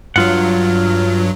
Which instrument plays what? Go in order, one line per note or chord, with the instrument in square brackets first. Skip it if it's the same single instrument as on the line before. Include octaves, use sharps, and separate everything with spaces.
[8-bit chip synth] G2 F#3 [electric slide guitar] F4 F#5